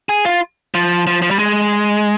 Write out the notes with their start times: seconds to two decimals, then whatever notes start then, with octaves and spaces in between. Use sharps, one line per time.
0.09 G#4
0.25 F4
0.74 F3
1.07 F3
1.22 F3
1.31 G3
1.39 G#3